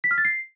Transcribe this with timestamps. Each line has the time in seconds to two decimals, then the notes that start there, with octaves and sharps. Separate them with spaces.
0.04 B6
0.11 F6
0.18 A6
0.25 C7